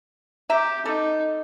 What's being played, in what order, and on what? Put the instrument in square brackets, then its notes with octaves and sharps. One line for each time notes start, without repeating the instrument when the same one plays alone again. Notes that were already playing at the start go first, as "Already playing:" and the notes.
[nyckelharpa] G4 [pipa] E5 A#5
[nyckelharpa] D#4 [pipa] A4